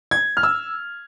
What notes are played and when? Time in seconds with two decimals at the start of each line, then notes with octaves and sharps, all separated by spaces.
0.11 G#6
0.37 F6
0.43 E6